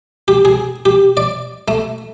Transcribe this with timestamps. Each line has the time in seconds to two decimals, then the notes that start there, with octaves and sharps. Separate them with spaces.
0.28 G4
0.45 G#4
0.85 G4
1.17 D5
1.68 A3